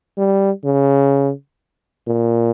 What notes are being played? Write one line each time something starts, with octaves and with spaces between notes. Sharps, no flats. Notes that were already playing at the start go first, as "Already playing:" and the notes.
G3
C#3
A#2